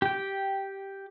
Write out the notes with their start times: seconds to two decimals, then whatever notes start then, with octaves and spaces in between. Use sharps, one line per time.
0.02 G4 G5